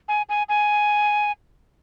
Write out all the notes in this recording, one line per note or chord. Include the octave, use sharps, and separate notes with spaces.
G#5
G#5
G#5